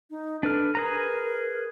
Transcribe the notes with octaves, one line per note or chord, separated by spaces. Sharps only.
D#4
D4 A4 B4 F6
G#4 A#4 B4 A#5